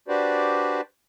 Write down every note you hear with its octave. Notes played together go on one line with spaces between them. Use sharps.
D4 F#4 G4 B4 C5 D5